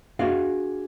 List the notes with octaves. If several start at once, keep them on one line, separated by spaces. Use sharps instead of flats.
D4 F#4 G#4 F5